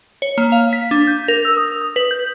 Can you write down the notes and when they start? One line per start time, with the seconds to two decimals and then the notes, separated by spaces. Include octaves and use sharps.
0.22 C#5
0.38 A#3
0.52 F5
0.73 B6
0.91 D4
1.07 G6
1.28 A#4
1.45 E6
1.57 D#6
1.81 D#6
1.96 B4
2.11 G6